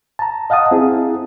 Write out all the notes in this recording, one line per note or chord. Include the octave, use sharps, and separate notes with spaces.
A5 A#5
D#5 F5 F#5 A5 D#6
C4 E4 G#4